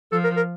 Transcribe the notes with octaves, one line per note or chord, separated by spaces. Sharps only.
F3 A4
A#4
A#4